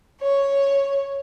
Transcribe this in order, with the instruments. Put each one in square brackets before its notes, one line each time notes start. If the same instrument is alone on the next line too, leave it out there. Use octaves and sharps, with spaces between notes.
[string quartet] C#5